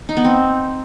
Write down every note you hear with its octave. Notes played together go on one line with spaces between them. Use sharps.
D#4
B3
C4